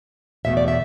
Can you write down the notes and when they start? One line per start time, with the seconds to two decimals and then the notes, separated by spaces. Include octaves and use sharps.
0.45 E2 B2 A3 E5
0.57 D5
0.68 E5